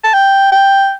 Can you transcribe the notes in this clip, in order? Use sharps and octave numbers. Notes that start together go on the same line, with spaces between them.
A5
G5
G5